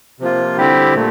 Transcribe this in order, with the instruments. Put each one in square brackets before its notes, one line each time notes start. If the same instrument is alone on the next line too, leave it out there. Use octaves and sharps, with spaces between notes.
[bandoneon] C3 F3 A#3 F4
D3 G3 C4 E4 G4
A#2 A3